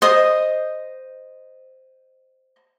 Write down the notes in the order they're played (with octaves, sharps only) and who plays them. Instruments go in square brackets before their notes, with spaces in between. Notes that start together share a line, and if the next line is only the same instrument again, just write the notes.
[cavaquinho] C5 D#5 D#6